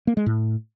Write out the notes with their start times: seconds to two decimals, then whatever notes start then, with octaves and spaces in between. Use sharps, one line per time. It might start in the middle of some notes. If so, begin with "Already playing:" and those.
0.07 A#3
0.17 G#3
0.26 A2